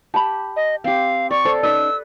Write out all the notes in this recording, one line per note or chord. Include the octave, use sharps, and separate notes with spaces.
G4 A5 B5
D#5
C4 G4 F5
D5 C#6
A4 C5
C#4 D#4 B4 D5 E6